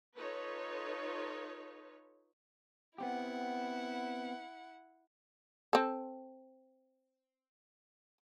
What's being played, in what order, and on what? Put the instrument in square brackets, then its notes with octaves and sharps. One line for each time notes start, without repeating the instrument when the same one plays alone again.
[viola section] D#4 F4 A4 B4 C#5
[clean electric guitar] B3 C4 G4 [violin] E4 F#5
[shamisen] C4 A4